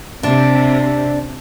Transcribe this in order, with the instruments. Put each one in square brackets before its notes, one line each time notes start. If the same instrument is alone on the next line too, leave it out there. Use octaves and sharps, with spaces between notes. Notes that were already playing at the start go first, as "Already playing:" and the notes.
[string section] C3 [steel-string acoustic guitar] D4